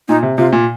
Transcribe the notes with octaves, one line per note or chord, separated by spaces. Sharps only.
A#2 D#4
C3
C3 F4
A#2